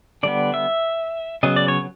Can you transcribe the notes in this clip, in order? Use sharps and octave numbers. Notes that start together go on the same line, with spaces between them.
D3 G3 B3 D5
E5
C#3 F#3 B3 D#5
D5
C#5